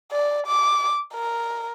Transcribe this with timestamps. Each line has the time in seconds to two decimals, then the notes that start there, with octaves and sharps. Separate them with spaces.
0.11 D5
0.46 D6
1.14 A#4